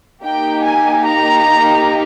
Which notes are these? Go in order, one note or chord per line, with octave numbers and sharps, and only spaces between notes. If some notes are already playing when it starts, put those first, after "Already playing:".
A#3 D#4 G4 G5
G#5
A#5